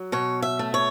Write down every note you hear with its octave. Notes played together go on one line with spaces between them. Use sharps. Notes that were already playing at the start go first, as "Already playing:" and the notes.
Already playing: F#3
B2 C#5
E5
A3
C#5